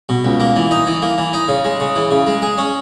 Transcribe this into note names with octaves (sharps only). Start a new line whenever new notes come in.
B2
C#2
A#3
E3
D#4
E3
A#3
E3
D#4
C#3
G#3
C#3
E3
C#3
G#3
G#4
C#4